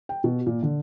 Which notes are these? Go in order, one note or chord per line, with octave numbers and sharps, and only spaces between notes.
G5
B2
A#2
D3